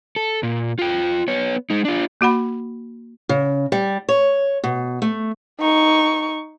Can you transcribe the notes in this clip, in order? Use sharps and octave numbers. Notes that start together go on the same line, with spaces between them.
A4
A#2
F4 G5
B3 C#5
G#3 D#4
D4 F4
A#3 F#4 F#5 B5
C#3
G3
C#5
B2
A3
D#4 C#6